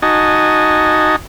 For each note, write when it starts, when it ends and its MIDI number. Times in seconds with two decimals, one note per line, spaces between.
0.02 1.16 63
0.02 1.16 66
0.02 1.16 75
0.02 1.16 80
0.02 1.16 81